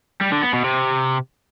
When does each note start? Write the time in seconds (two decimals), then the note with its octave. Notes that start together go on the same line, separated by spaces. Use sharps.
0.21 G3
0.32 D3
0.43 B3
0.54 B2
0.64 C3